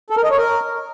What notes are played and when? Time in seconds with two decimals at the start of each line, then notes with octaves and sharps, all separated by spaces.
0.10 A4
0.17 A#4
0.24 D#5
0.31 C#5
0.38 A#4